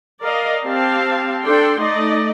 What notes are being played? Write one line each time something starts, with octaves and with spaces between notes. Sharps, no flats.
A#4 D5 D#5 F5
C4 G4 F5 A5
D4 A4 D5 G5 C6
A3 D#4 D5 D#5